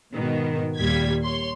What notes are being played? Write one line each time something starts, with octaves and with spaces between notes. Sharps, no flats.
G#2 B2 D#3 B3
D#2 A#2 G3 G#6 B6
C#5 C6